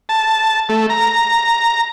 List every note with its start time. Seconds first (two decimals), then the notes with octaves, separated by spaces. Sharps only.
0.09 A5
0.69 A3
0.89 A#5